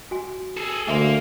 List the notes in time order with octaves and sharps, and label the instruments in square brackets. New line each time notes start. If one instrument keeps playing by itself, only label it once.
[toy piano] F#4 G#5
[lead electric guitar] G#4 A4
[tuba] D2 [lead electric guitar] A#3 [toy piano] E5 G#5 C6